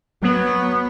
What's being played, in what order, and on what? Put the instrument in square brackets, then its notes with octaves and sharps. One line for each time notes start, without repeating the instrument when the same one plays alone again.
[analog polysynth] F#3 [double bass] B3